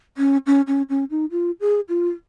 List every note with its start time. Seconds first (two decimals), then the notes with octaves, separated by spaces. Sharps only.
0.17 C#4
0.46 C#4
0.67 C#4
0.89 C#4
1.10 D#4
1.31 F4
1.60 G#4
1.89 F4